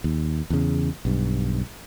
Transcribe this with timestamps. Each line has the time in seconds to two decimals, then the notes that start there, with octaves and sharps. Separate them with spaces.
0.04 D#2
0.50 E2 C#3
1.05 B1 G2